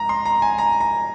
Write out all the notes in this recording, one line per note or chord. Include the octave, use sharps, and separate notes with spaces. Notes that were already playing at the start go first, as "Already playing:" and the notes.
Already playing: G#2 A#5
C6
A#5
G#5
A#5
A#5